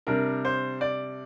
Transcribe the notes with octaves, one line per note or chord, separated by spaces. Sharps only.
C3 G3 D4 A#4
C5
D5